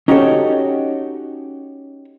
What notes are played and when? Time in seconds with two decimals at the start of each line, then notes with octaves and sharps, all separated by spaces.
0.08 C#4 D#4 F#4 G4 A4 C#5